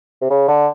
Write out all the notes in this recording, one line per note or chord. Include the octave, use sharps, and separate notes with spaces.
C3
C#3
D3